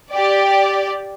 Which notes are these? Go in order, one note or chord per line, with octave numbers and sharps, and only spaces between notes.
G4 D5